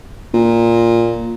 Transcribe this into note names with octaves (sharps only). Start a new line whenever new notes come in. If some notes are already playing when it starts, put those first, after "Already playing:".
A#2